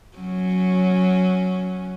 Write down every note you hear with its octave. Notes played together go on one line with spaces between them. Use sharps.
F#3 C#4